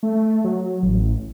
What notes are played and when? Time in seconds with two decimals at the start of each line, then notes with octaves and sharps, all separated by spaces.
0.03 A3
0.44 F#3
0.83 A1